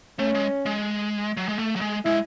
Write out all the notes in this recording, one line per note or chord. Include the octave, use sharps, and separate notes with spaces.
A3 C#4
G#3
G#3
F#3
G#3
A3
F#3
G#3
G#3 E4